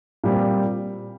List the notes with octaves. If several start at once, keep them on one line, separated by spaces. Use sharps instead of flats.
A#2 G3 C4